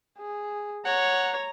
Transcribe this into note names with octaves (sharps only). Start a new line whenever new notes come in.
G#4
C#5 F#5 A#5